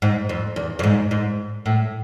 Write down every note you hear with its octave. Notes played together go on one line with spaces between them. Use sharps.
G#2
F2
E2
F2
G#2
G#2
A2